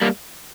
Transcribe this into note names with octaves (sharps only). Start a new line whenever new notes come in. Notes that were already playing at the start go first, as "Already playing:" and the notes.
G3 A#3